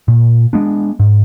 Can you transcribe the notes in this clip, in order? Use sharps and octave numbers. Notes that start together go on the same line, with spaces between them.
A#2
G#3 B3 D4
G#2